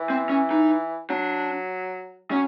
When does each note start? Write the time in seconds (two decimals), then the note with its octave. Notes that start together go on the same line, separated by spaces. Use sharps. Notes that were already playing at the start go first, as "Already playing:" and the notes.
Already playing: E3
0.10 C4
0.29 C#4
0.51 D#4
1.10 F#3 D4
2.31 F#3 C#4